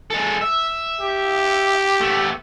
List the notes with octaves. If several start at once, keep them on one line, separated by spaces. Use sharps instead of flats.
G#3 A4
E5
G4
A3 B3